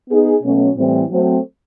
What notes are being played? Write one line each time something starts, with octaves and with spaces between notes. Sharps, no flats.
B3 D#4 G#4
B2 F#3 A3 C#4
A2 E3 G3 C4
F#3 A3 C4